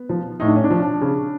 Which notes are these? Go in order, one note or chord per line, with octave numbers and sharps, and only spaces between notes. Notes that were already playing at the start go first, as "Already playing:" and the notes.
Already playing: B3
F3
A2 D#4
D4
C#4
D4
F3
C#3